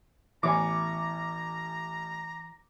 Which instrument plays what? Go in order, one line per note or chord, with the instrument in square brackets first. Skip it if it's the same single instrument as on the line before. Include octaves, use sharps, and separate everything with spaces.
[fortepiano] A1 C#5 G#5 [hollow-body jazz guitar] E3 B3 E4 [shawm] A#5 [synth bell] D6